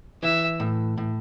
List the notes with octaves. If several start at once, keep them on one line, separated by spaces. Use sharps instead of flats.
E3 E5
A2
A2